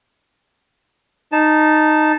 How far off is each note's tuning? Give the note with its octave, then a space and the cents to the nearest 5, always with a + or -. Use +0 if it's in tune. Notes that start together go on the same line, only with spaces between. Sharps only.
D#4 -10 A5 +0